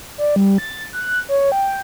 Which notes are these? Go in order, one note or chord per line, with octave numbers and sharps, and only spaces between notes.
D5
G3
A6
F#6
C#5
G5